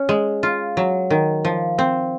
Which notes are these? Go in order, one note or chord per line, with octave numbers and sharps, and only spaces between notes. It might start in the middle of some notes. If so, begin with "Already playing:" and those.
Already playing: C#4
G#3
F4
F#3
D#3
F3
C4